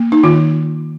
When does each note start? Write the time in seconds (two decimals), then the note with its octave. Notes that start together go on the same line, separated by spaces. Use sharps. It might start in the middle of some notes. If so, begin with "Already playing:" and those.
Already playing: A#3
0.12 D#4
0.23 D#3 F4